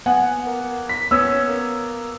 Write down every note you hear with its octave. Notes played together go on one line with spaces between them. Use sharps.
B3 F#5 G#5
A#3
B6
B3 C#4 E6 G#6
A#3